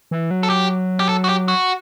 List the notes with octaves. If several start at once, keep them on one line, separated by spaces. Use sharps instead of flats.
E3
F#3
A4
G4
G4
A4
F#4
G4
F#4